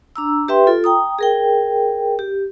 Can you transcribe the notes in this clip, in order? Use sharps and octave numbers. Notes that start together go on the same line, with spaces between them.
D4 A#5 E6
G4 B4 E5 G5 C6
F4 A4
G5 A#5 D#6
G#4 A#4 G5
G4